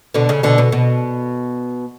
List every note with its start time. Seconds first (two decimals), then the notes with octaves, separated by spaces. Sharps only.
0.14 B2 D3
0.29 C#3
0.43 B2 D3
0.58 B2
0.72 B2